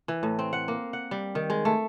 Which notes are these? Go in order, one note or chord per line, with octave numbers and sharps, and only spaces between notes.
E3
A2
C4
F#5
A#3
F#5
G3
D#3
G#3
A3